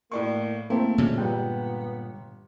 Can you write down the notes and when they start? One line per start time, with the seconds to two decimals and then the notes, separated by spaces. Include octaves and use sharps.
0.12 A2 A#3 D5 C#6
0.70 A3 A#3 C4 E4
0.98 A#2 D3 G#3 C#4
1.18 G1 G3 B3 G5